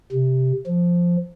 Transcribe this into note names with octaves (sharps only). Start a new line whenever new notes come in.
C3
F3